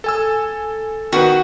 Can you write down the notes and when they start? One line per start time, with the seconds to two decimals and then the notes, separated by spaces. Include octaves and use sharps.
0.04 A4 G#5 E6
1.13 D#3 B3 F#4 B4